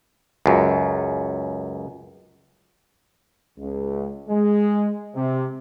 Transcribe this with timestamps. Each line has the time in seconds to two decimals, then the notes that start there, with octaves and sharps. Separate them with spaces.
0.46 C#2 F#2
3.58 C#2
4.29 G#3
5.15 C3